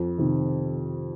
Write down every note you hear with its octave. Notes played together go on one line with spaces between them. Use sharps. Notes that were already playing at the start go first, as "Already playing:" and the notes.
Already playing: F2
C3 D#3